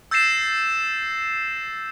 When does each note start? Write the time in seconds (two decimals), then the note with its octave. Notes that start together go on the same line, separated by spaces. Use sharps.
0.11 E6 G6 A6 A#6 C7 E7